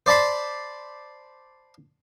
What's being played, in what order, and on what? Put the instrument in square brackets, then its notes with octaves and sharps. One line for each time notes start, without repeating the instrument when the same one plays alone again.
[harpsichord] C5 D5 A5 B5 C6